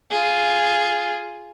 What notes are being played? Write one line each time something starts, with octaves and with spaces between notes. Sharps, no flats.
F4 G#4